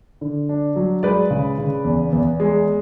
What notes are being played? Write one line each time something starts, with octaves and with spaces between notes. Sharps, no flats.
D3
D4
F#3
G#3 B4 D5
C#3
C#3
E2
E2
G#3